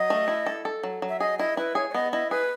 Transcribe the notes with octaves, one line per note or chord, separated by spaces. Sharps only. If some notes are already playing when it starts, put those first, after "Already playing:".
Already playing: F#3 D#5
A3
E4
A4
A4
F#3
F#3
E5
G#4 D#5
E4 D#5
E4 B4
G#4 C#5
C#5
B3 D#5
E4 D#5
G#4 B4